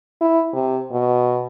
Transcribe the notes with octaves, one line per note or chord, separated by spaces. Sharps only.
E4
C3
B2